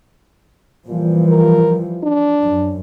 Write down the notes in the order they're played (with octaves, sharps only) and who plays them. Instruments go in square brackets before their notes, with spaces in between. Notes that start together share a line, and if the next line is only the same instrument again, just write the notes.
[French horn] A#2 [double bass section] E3 F3 G3
[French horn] A#4
D4
[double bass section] F#2